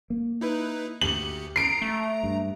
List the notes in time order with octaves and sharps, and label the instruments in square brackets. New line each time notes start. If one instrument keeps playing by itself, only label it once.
[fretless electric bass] A#3
[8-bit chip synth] D#4 E4 B4
[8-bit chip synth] D2 G4 C#7 [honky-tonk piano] F#7
[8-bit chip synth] A#5 [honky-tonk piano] C7 D7
[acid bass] A3
[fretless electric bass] G2